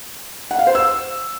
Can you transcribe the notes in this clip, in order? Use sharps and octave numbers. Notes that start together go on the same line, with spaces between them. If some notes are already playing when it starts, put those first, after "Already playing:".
F#5
F5
C5
E6